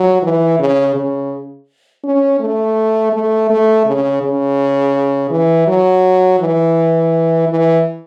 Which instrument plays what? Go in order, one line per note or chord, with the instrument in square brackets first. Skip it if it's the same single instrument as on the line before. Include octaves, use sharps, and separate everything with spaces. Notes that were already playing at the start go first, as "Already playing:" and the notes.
Already playing: [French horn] F#3
E3
C#3
C#3
C#4
A3
A3
A3
C#3
C#3
E3
F#3
E3
E3